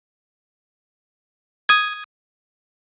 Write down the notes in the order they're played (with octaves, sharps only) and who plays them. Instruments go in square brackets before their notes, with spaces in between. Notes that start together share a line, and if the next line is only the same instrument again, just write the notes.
[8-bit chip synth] D#6 G#6